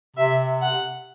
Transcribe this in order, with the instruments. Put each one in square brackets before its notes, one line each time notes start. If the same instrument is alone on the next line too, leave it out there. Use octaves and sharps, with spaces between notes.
[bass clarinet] C3 [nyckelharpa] E5
[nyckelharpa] F#5